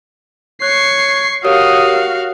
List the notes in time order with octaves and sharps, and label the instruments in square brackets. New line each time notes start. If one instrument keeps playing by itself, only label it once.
[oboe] C#5 [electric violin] C#6 C7 [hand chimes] F#6
[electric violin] F#4 F5 [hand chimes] G4 A#4 C#5 [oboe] D#6